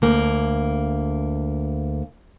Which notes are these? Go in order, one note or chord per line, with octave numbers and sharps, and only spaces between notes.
D2 A#3